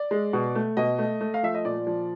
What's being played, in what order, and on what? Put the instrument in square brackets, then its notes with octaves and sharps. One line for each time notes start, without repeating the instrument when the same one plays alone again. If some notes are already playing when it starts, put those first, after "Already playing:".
Already playing: [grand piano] D5
G#3
B2
A3
B2 D#5
A3
A3
F5
F3 E5
D#5
A#2 D5
F3